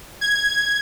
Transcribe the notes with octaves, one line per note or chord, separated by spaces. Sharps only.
G#6